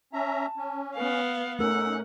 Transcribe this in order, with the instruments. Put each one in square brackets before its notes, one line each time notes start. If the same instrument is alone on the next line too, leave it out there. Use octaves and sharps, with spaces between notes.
[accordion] C#4 E5 A#5 [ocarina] A5
[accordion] C#4
[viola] B3 F5 [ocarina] B4
[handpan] A3 A#4 [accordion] C#4 D#4 [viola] F#5 [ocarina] E6